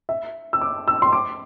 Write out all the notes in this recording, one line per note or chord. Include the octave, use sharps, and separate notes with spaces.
E5
E6
D6
E6
C6
D6